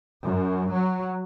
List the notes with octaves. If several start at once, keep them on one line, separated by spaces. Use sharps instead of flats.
F#2
F#3